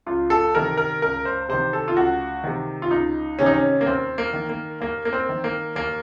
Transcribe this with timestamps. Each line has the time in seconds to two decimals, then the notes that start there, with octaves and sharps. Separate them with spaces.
0.06 C#2 F4
0.30 A4
0.54 C3 D#3 A#4
0.77 A#4
1.02 C#2 A#4
1.25 C5
1.49 C3 D#3 C5
1.73 A4
1.88 F4
1.96 C#2 F#4
2.44 C3 D#3
2.82 F4
2.91 C#2 D#4
3.39 C3 D#3 C#4
3.46 D#4
3.54 C#4
3.81 A#3
3.86 D#2 C4
4.18 A#3
4.33 D#3
4.50 A#3
4.81 D#2 A#3
5.05 A#3
5.13 C4
5.29 D#3
5.44 A#3
5.75 D#2 A#3